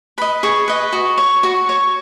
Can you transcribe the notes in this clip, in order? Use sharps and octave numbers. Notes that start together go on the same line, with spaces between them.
B4 D#5 B5
G#4 C#6
B4 D#5
F#4
C#5
F#4 C#6
C#5